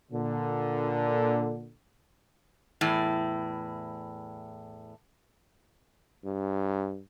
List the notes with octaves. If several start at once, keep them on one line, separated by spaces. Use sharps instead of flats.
A#2 D3
E2 A2
G2